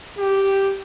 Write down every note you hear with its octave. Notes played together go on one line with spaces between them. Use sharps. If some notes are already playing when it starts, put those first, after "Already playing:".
G4